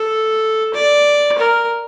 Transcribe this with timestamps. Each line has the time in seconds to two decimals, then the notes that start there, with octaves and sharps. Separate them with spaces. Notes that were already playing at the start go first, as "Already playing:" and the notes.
Already playing: A4
0.75 D5
1.38 A#4